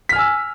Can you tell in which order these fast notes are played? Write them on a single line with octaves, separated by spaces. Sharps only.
B6 F6 G#5 E6